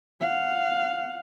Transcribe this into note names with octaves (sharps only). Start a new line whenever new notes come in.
F5 F#5